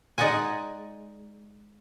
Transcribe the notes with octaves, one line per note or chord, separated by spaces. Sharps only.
G#3 D#4 D5 D#5 F#5 G#5